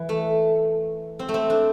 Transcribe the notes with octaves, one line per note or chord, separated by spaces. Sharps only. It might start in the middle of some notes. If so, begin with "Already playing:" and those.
Already playing: E3
A3
C4
A3
C4
D4